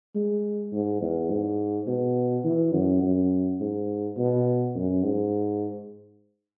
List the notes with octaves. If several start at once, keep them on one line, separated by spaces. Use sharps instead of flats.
G#3
G#2
E2
G#2
B2
E3
F#2
F#2
G#2
B2
F#2
G#2